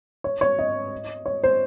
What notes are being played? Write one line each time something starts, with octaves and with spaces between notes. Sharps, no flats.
C#5
C#5
D#5
C#5
C5